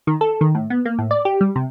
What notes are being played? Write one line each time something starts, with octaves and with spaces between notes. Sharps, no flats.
D#3
A4
D#3
A2
B3
A#3
A2
D5
G4
G3
C3